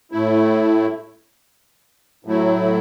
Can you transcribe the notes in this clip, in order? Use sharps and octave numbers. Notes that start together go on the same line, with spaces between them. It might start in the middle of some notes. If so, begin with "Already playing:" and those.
A2 A3 E4
A2 F#3 A3 E4